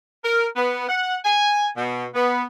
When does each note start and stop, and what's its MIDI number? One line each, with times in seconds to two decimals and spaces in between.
0.25 0.46 70
0.56 0.87 59
0.89 1.17 78
1.25 1.68 80
1.77 2.05 47
2.14 2.45 59